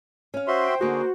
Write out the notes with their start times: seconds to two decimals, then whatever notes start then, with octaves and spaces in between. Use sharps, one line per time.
0.34 C#4 F5
0.47 F#4 C5 E5 C6
0.63 G5
0.81 D3 A#3 D#4 F#4 G#4